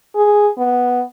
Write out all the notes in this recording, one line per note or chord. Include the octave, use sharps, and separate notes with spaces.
G#4
B3